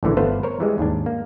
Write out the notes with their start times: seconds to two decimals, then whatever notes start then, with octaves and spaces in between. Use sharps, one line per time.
0.03 A#1 A2 D3 E3
0.17 G1 A3 B3 B4 C5 F5
0.43 A#4 C5 C#5
0.60 E3 G3 G#3
0.78 D#2 G#2 D4
1.06 A#3